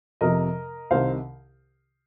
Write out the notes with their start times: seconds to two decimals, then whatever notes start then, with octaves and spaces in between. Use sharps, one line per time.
0.21 F2 C3 F3 A#4 D#5
0.91 C2 C3 D#3 C5 F5